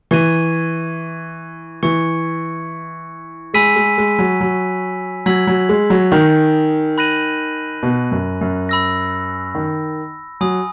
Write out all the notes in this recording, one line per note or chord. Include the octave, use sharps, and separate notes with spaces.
E3 C#6 G#6 D#7
E3 C#6 G#6 C#7
G#3 G#5 B5 E6 B6 D#7
G#3
G#3
F#3
F#3
F#3 E6 G#6 B6 F#7
F#3
G#3
F#3
D#3
B5 F#6 A#6 D#7 F#7
B2
F#2
F#2
B5 E6 A#6
D#3
F#3 G#5 B5 D#6